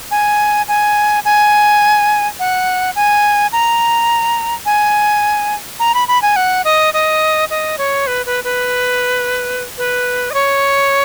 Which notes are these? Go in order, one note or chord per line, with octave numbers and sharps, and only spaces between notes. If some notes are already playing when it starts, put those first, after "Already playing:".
G#5
G#5
G#5
F#5
G#5
A#5
G#5
A#5
B5
B5
G#5
F#5
D#5
D#5
D#5
C#5
B4
B4
B4
B4
D#5
C#5